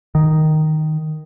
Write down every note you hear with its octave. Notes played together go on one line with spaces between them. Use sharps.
D#3